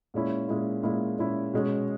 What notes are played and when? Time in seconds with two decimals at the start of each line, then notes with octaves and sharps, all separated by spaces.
0.14 A#2 G#3 C#4 E4
0.48 A#2 G#3 C#4 E4
0.83 A#2 G#3 C#4 E4
1.18 A#2 G#3 C#4 E4
1.53 B2 G#3 C#4